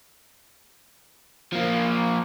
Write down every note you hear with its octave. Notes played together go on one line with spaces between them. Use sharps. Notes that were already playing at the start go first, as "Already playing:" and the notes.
F3 A#3